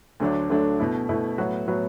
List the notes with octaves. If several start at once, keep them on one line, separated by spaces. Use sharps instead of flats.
D2 D3 F#3 A3 D4
D2 D3 F#3 A3 D4
B2 A3 E4
B2 A3 E4
A2 F#3 B3 F#4
A2 F#3 B3 F#4